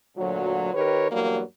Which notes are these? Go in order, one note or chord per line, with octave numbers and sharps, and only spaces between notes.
D2 A#2 F#3
D#3 G4 A#4 B4 C#5
E2 G2 F#3 G3 A#3